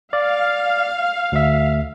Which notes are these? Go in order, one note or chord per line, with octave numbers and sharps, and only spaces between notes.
D5 F5
D2 E5